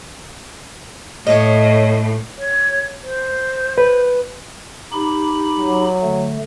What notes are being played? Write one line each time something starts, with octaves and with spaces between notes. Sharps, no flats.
A2 C#5 D#5
C#5
C5
B4
D#4 G4 B5
F#3
D3 A3